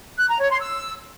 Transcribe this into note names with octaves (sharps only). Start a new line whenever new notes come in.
F#6
A#5
C#5
C6
E6